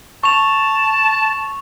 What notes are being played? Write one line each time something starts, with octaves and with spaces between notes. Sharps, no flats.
A5 C#6 F7